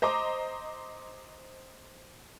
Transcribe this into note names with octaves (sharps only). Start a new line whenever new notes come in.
C5 D#5 A#5 D6